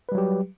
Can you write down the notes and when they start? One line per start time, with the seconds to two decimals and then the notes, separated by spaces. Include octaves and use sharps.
0.09 B4
0.12 G3
0.15 F#3
0.18 G4